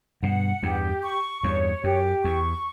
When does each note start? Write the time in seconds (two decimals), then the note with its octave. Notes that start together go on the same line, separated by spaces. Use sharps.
0.23 G2 B2 F#5
0.63 E2 G2 G4
1.03 C#6
1.43 E2 G2 C#5
1.84 F#2 G4
2.24 E2 C#6